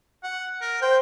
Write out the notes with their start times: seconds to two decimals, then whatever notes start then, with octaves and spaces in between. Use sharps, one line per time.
0.24 F#5
0.62 A#4
0.82 C5 G5